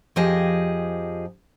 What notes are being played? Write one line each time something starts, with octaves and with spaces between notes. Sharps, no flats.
F2 F3 G4 G#4 D#5